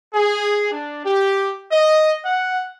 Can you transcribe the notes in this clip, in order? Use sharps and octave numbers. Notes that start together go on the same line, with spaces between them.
G#4
D4
G4
D#5
F#5